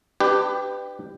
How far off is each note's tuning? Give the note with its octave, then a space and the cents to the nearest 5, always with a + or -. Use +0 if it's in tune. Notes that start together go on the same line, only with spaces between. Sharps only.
D4 +40 G4 +0 B4 +25